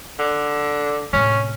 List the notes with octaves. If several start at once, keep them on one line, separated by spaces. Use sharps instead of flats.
D3
A2 C3 C#4